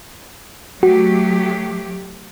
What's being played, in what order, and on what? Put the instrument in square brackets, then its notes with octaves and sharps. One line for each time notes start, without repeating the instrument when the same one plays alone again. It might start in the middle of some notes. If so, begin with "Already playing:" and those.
[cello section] F#3 A3 G4 [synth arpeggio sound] F#4